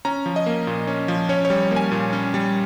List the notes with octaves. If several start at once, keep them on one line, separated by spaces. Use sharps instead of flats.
C#4 A#5
F3
D#5
A#3
A#2
C#4
F3
C#4 C#5
C#5
G3
A#3
G#5
A#2
C#4
G3